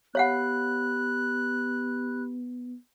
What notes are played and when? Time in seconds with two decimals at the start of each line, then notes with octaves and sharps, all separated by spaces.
0.15 B3 G4 C#5 F5 F#5 B5 F#6